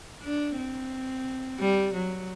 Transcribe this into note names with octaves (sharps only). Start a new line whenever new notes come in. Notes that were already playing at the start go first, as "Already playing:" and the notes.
D4
C4
G3
F#3